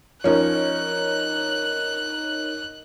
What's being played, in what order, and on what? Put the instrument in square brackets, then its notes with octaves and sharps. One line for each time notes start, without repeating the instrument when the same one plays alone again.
[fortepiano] F3 C#4 [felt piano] D#4 A#4 C#5 [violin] F#6